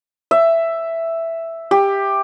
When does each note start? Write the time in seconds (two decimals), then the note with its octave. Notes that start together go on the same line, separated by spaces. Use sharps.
0.31 E5
1.71 G4